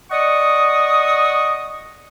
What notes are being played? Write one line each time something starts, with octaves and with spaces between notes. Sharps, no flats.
D5 D#5 F#5 C#6 D#6